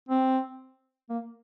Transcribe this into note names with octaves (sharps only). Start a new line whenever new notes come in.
C4
A#3